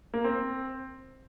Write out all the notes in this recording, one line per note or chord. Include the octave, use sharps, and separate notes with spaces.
A#3
C4